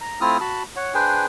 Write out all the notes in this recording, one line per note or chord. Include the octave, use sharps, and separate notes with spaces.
A#5
A3 C4 E4 F4 D#6 F6
F#4 A5 B5
C#5 F#5
D4 G#4 B4 C5 G5 G#5